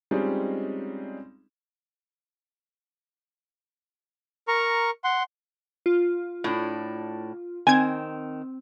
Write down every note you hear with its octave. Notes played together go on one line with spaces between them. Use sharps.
G3 G#3 C4 C#4 D#4 F4
A#4 A#5 C#6
F#5 C6
F4
A2 D4
D#3 C4 G#5 G#6